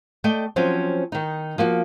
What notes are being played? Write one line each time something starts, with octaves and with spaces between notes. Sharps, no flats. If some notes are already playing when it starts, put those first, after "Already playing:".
A3 D5 D#5 G5
F3 F#3 C4 C#4
D#3 D#4
F3 A#3 F#4